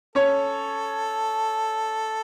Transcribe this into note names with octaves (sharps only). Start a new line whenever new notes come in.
C#4 A4 C#5